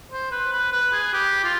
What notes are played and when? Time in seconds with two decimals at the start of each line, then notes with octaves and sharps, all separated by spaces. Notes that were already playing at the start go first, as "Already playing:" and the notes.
0.12 C5
0.31 B4
0.52 B4
0.72 B4
0.93 G#4
1.13 G4
1.44 F4